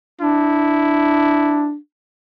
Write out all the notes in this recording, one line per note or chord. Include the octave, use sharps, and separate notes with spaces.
D4 E4